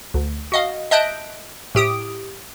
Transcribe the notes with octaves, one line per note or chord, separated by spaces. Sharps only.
D2
F#4 D#5 F5
D#5 E5 A5 F#6 G6 D7
A2 G4 D#6 D7